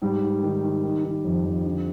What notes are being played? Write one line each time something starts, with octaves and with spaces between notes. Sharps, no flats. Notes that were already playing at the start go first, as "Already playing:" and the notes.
G#2 G3
G#2
D#3
D#3
D#3
D#3
F2
F2
D3